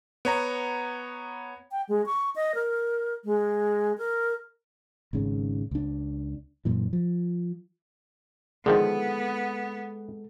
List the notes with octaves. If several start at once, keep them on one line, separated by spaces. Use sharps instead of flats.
B3 C#5 A#5
G5
G#3
C#6
D#5
A#4
G#3
A#4
G#1 G#2 C#3
C#2 D4
F#2 A#2 E3
F3
D3 D#3 F3 G#3 B3 G#4 A4